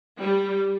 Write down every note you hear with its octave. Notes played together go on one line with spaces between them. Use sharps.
G3